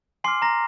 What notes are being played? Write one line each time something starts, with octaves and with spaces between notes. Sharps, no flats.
G#5 C6 D6 F6 C7
A#5 A#6